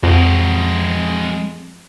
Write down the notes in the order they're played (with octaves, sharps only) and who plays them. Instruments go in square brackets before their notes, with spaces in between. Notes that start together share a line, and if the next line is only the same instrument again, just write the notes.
[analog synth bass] F2 [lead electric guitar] G#3 F#4